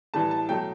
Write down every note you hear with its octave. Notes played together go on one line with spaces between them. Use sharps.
A2 E3 G3 A5
A5
B2 F#3 A3 G5